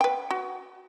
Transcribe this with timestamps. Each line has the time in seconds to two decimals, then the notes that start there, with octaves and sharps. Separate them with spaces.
0.01 B4 G5
0.31 F#4